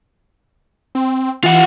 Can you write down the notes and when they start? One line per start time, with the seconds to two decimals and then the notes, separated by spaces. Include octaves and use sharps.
0.95 C4
1.44 E3 F4 F#5